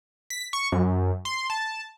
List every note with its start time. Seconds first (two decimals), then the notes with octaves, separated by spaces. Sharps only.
0.30 B6
0.53 C#6
0.72 F#2
1.25 C6
1.50 A5